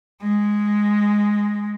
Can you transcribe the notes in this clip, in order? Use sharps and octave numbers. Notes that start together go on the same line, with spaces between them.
G#3